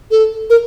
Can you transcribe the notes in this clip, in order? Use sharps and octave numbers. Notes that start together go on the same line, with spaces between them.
A4
A#4